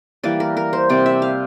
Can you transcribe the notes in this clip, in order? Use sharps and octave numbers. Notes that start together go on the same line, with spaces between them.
E3 G3 A#3 D5
A#4
A#4
C5
C3 G3 C4 D5
E5
F5